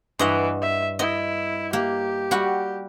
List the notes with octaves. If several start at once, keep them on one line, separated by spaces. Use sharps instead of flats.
G2 E3 D#5 F#5
E5
E4 D#5
A#3 G4
G3 F#4 F#5